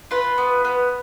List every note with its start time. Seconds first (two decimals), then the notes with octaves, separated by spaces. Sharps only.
0.11 F4 B4
0.38 B3
0.65 B3